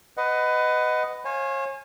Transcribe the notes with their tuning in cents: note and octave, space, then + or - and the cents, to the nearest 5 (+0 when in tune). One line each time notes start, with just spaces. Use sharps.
B4 +20 D#5 +0 F#5 +0
C#5 -35 F5 +0 G#5 +0